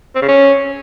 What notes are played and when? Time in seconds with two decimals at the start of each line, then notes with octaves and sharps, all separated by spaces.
0.15 C4
0.22 C#3
0.28 C#4